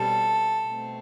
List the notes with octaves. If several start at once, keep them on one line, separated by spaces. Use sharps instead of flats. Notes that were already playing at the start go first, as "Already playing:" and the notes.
Already playing: B2 G3 C4 A4
B2 A3 C4